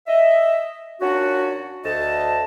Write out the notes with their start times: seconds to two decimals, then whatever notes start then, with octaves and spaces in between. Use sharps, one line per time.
0.07 D#5 E5
1.00 A#2 C#4 D4 F#4
1.85 D2 D#5 A5